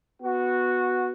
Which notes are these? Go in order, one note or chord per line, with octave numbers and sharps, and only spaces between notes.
B3 F#4